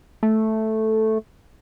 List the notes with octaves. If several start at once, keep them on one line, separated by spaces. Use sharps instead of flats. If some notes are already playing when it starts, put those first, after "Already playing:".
A3